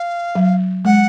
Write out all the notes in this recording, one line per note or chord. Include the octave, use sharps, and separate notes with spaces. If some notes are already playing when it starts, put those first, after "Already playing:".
Already playing: F5
F#3
G#3 F#5